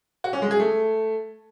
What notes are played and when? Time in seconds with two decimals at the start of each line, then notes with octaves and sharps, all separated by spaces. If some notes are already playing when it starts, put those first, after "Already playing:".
0.24 F#4
0.33 C#4
0.42 G#3
0.51 G#4
0.60 A3